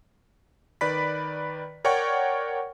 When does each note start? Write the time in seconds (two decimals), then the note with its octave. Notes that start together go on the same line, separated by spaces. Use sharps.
0.81 D#3 B4 D5 B5 B6
1.85 A#4 C#5 D5 F#5 G5 C#6